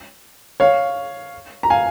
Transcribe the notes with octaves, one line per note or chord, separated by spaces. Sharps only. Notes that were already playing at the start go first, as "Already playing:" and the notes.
C#5 F5
A#5
F5 G#5